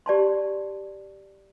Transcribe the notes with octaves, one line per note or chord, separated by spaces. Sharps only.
G4 D5 A5 C6